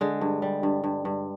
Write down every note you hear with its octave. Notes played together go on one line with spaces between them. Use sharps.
D3 G#3
G2
G3
G2
G2
G2